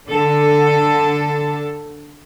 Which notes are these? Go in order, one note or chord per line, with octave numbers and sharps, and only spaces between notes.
D3 A4